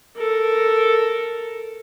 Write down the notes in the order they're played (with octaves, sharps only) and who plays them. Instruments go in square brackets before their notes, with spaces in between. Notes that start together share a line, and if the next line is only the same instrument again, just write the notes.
[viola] A4 A#4